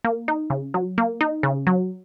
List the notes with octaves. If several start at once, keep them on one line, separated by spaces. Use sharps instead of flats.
A#3
D#4
C#3
F#3
A#3
D#4
C#3
F#3